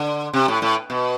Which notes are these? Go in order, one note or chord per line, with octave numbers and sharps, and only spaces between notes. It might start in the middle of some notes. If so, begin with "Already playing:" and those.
Already playing: D3
C3
A2
A2
B2